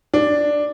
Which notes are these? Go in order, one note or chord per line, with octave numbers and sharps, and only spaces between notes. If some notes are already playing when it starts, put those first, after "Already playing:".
D4